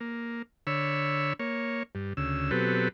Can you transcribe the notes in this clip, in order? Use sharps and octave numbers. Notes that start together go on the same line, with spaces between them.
A#3
D3 C#5 B5 E6
A#3 C#5
G2
D2 C#3 E6
B2 F#3 C4 G4 A4 B4